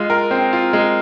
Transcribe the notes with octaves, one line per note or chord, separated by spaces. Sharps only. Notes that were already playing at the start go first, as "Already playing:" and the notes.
Already playing: G#3 F4
A#4
C4
F4
G#3